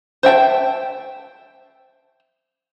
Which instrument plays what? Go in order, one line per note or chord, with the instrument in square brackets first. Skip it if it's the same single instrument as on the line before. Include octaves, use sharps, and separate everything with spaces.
[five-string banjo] C5 E5 G5 A5